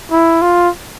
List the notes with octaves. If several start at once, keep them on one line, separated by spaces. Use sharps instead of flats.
E4
F4